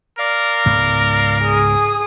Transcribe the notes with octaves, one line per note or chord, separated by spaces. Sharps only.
A#4 D5 F5
C#2 G#2 B3
G#4 D#6